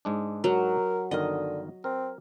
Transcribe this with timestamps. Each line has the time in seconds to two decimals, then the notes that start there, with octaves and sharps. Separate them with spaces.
0.05 G#2 G#3 D4
0.44 F#3 A#4
1.11 G1 D3 D#3 A#4 D#5
1.84 C4 A#4